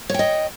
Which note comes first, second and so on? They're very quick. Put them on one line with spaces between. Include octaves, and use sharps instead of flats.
C#5 G5 D#5